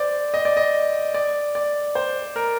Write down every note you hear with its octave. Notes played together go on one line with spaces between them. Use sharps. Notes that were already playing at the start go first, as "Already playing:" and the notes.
Already playing: C5 D5
D#5
D5
D#5
D5
D5
C5
A#4